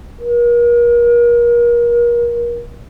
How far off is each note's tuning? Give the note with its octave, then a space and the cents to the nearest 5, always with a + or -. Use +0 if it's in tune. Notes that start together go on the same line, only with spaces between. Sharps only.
A#4 +35